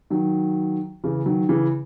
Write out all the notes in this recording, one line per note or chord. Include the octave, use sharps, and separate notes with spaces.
D#3 F#3
C#3 E3
D#3 F#3
C#3 E3